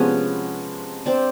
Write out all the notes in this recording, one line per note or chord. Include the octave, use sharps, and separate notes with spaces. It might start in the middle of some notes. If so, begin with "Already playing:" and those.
Already playing: C3 F3 G#3 B3 C#4
C4 D4